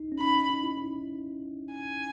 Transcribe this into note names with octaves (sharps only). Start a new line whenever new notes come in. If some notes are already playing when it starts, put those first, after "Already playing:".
Already playing: D#4
C#4
D#4 B5
D#4
E4
D#4
G#5